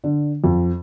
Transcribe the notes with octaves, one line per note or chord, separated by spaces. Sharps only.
D3
F2